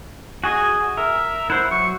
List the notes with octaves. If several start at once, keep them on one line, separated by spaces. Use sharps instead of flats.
F#4 G#4 D#5 G#5
A#4 E5
E4 C5 F#5
F#3 C#6